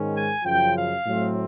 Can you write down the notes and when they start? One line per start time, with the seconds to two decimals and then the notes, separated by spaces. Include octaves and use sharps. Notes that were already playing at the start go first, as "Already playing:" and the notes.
Already playing: G#2 D#3 G#3 C#4
0.13 G#5
0.44 F#2 C#3 F3 G5
0.74 F5
1.05 A2 F#3 A3 C4